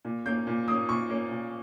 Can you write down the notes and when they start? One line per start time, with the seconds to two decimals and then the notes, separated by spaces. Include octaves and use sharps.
0.05 A#2
0.25 A#3 C#4 G6
0.47 A#2
0.68 A#3 C#4 D#6
0.88 A#2 C#6
1.10 A#3 C#4
1.31 A#2